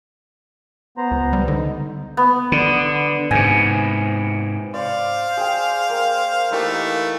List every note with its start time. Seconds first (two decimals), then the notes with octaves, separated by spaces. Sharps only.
0.97 B3 C5 A#5
1.11 C#2
1.33 G3
1.48 D3 D#4
2.17 B3
2.52 D3
3.31 G#2 C3 G#5
4.74 C5 D5 F5
5.37 G#4 G5
5.89 A#3
6.52 E3 A3 A#3 D#4 G4